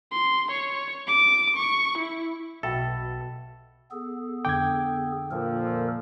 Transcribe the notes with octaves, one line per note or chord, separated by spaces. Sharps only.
C6
C#5
D6
C#6
E4
B1 B2 F#4 A4 E5 G5 B5
B3 G#4 A4
F2 D3 G5 D6 G#6
A#2 F3 A4 A#4